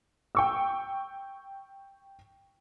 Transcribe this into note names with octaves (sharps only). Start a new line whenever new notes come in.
G5 C#6 E6